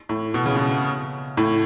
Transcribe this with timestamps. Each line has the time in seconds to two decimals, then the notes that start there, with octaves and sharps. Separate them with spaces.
0.09 A2
0.34 B2
0.45 C#3
0.55 B2
1.37 A2